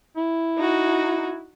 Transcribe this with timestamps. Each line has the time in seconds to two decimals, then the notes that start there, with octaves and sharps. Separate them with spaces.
0.17 E4
0.58 D#4 F#4